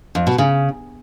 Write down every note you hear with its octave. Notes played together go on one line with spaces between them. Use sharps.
F2
B2
C#3